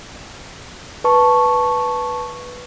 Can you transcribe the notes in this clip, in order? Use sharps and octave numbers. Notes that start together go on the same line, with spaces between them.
B4 A5 C#6